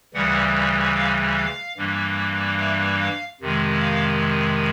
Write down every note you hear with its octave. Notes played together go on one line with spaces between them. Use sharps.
D2 C#3 E3 G3 F#5
F5
F5
G2 E3 G3 A#3
E5
F5
F2 C3 D#3 G#3
F5